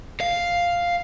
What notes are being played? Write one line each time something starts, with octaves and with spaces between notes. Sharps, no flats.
F5